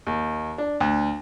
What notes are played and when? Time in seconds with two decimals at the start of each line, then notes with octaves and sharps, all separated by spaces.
0.07 D#2
0.58 D4
0.81 D2